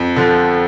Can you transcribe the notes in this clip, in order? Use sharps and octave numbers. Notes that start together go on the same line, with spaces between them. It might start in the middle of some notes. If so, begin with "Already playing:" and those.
Already playing: F2
D3 F3